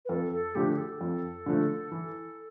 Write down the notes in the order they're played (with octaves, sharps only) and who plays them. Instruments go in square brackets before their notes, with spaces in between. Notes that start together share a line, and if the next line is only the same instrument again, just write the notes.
[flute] B4
[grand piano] F2 [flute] A4
[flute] A4
[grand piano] D3 F3 A3 [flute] G4
[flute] G4
A4
[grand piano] F2
D3 F3 A3
E3